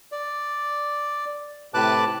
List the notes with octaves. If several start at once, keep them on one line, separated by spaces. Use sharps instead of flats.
D5
A2 C3 B4 A5 D6 F#6